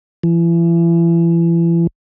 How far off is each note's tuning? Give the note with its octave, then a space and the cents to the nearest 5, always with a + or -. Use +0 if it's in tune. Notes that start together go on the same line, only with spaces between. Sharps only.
E3 +35